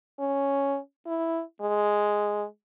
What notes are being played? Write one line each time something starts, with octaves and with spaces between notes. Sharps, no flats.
C#4
E4
G#3